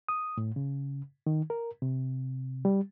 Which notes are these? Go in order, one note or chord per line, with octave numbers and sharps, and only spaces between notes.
D#6
A2
C#3
D#3
A#4
C3
G3